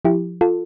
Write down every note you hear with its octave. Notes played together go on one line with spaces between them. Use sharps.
F3 E4 G4
F4 A4